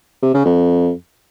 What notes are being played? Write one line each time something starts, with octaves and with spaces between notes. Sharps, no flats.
C3
C#3
F2